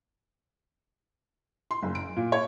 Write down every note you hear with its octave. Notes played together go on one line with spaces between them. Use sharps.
C6
F#1
D7
A#2
C#5